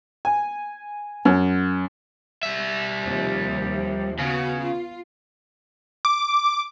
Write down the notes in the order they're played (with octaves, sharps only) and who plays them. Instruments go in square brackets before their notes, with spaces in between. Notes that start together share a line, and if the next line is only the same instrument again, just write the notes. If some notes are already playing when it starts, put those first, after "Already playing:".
[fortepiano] G#5
F#2
[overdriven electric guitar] G3 E5
[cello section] D#2 C3 F3
[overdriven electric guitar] C#3 [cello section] B3 F#4
[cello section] F4
[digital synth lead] D6